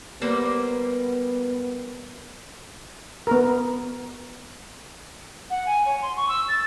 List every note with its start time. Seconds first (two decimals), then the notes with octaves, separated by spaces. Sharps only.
0.21 G3 A#3 B3 C5
3.27 B3 A#4
5.50 F#5
5.66 G#5
5.86 C#5
6.02 C6
6.17 C#6
6.29 E6
6.48 A6